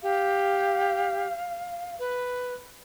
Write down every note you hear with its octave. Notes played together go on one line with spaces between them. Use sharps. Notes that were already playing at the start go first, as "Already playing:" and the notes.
G4 F5
B4